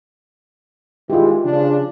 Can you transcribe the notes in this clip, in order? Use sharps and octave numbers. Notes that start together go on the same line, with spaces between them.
D#3 E3 G#3 F4 G4
C#3 F3 D4